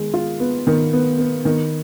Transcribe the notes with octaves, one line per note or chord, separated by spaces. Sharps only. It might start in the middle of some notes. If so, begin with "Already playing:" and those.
Already playing: D#3 G#3
F4
B3
D#3
B3
B3
D#3